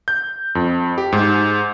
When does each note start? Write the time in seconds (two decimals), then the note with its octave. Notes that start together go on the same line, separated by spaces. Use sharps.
0.08 G6
0.55 F2
0.98 G4
1.12 G#2